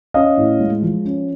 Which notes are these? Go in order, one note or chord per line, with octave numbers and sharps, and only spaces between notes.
C#4 D#5 F5
A2
G#3
F3
C#4